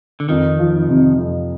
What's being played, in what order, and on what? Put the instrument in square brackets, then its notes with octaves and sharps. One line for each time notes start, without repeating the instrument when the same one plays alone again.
[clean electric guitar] D3
[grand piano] F2 [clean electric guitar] D#3
[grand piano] F3
C3
F2